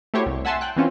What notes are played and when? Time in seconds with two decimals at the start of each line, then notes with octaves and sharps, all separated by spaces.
0.14 A3 E4 F#4 G4 C5 C#5
0.26 C2
0.45 E5 F#5 G#5 A5 C6 E6
0.61 G5 F#6
0.76 E3 C4 C#4 F4